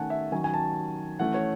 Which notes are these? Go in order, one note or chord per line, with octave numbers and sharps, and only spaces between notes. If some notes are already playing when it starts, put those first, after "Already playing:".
Already playing: D#3 A3 C#4 F#5 G#5 A5
E5
D#3 F#3 C#4 G#5
G#5
A5
E3 A3 C#4 F#5
C#5